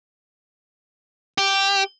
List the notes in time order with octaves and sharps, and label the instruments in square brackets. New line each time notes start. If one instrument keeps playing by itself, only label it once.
[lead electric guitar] G4